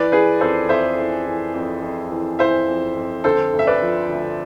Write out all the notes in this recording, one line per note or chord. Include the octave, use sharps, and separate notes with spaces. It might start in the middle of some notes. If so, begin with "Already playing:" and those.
Already playing: E3 B4 D5
E3 G#4 B4
F2 A4 C5
F2 C5 E5
E3
E3
F2
F2
E3
E3 C5 E5
F2
F2
D3 A4 C5
D2
E5
B4 D5
F3
D2